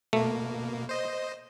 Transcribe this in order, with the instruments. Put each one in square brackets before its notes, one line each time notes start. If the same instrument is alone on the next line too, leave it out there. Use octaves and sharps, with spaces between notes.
[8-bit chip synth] B2 A#3 [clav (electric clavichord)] A3
[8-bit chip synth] C5 D#5